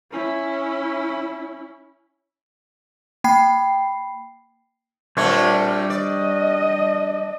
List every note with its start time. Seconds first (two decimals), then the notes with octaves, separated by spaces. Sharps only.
0.11 C#4 E4
3.24 A#3 G5 B5 C7
5.17 A#2 G3 A3 C4 D4 C#5
5.90 D5 D#5